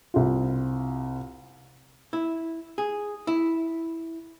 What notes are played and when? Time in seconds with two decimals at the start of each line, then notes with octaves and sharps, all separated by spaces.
0.14 C2 F4
2.13 E4
2.78 G#4
3.27 E4